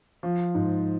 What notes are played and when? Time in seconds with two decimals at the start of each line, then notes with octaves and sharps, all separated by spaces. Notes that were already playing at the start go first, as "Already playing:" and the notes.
0.23 F3
0.55 G#2